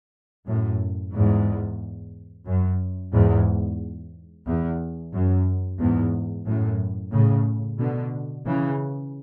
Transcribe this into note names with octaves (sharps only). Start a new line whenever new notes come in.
F#2 A2
E2 G#2
F#2
E2 G#2
E2
F#2
E2 G#2
F#2 A2
A2 C#3
B2 D3
C#3 E3